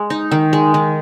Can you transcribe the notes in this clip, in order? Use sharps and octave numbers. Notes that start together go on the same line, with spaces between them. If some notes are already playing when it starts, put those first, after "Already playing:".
Already playing: G#3
D#4
D#3
G#3
D#3